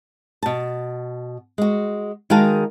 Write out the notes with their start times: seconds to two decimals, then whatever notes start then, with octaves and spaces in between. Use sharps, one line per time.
0.43 B2 A5
1.58 G#3 F#4
2.30 D#3 G#3 F#4 A#4 F5 A5